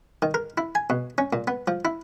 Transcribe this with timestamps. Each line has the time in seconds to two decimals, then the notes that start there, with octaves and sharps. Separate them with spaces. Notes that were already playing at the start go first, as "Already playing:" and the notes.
0.22 D#3
0.34 A#4
0.58 E4
0.75 G#5
0.90 B2
1.18 C#4
1.33 A#2
1.48 B3
1.68 F3
1.85 E4